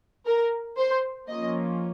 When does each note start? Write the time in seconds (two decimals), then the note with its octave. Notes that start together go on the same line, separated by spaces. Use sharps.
0.26 A#4
0.77 C5
1.29 F3 A#3 C#4 F4 D#5